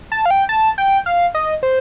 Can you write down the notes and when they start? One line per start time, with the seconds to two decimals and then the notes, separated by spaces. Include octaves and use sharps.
0.12 A5
0.26 F5
0.31 G5
0.49 A5
0.78 G5
1.06 F5
1.35 D#5
1.63 C5